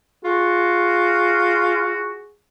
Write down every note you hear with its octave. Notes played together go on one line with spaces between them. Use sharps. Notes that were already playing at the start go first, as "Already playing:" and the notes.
F4 F#4 G#4